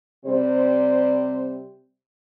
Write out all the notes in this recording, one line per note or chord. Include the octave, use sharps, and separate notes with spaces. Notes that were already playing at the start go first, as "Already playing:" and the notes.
C3 G3 C5